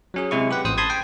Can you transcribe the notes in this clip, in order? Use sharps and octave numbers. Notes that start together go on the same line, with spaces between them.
F#3 C#4 G#4
C3 G#3 E4 C#6
G4 B4 F#5
A1 C5 D#6
A5 B5 C6 D#6 G#6
G5